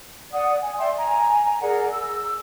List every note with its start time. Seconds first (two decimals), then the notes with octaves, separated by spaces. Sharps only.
0.32 D5 F#5 D#6
0.61 G#5
0.79 D5 E5 G5 C6
0.97 G#5 A#5
1.61 G#4 A#4 D5 F#5
1.91 E6